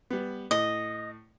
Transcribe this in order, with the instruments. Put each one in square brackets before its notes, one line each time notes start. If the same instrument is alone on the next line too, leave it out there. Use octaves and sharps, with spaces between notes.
[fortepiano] G3 B3
[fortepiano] A2 [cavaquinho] D#5